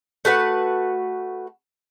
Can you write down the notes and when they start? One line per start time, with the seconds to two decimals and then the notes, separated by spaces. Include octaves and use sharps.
0.25 A3 F#4 B4 F#5